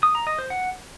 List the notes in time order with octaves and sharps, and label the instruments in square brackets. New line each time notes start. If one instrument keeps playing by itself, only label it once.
[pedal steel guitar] D#6
A#5
D#5
C5
F#5